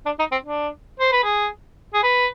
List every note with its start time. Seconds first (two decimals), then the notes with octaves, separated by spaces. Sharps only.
0.06 D4
0.19 D#4
0.32 C4
0.44 D4
1.00 C5
1.12 B4
1.24 G#4
1.94 G#4
2.03 B4